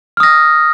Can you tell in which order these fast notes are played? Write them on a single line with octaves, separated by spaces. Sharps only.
F6 D#6 A#6